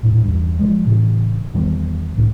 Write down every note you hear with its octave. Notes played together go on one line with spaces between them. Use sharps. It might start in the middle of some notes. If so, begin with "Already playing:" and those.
D#1 A2
E2 G2
F3 G#3
A2 C#3 E3
E2 D#3 G3 B3
C#2 A2